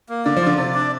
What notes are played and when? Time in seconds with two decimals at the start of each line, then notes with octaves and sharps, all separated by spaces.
0.09 A#3
0.25 D3 D5
0.37 F3
0.41 F4
0.47 D3
0.58 C3 D5
0.75 D4